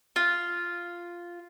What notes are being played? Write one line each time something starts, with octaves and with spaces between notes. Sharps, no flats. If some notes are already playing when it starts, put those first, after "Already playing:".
F4